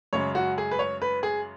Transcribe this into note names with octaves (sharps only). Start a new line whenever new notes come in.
F#2 C#3 G#3 C#5
F#4
G#4
B4
C#5
B4
G#4